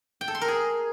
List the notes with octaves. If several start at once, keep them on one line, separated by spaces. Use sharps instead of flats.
G5
A4
C6
A#4
G#4